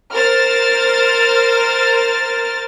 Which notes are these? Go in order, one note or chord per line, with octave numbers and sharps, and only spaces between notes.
A#4 C5 F6 A6